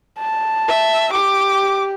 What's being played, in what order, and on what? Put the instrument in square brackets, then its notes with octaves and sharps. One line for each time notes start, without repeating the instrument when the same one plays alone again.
[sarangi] A5
[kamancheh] E5
[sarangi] G4 [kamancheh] D6